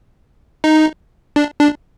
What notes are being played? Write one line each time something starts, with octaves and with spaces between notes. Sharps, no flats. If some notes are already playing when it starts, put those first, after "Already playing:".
D#4
D4
D4